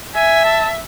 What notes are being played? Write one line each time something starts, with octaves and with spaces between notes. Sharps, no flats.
E5 G#5
A5